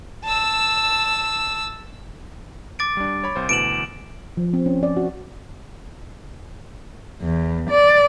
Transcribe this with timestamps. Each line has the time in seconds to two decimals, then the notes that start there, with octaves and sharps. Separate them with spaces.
0.25 A5 E6
2.79 D6 A6 D7
2.97 G3 D4
3.24 C#5 B5
3.36 C2 C5
3.49 D2 B2 E3 D7 E7 F#7
4.37 F3
4.53 C4
4.66 C#4
4.83 D5
4.97 F#4
7.22 E2
7.70 D5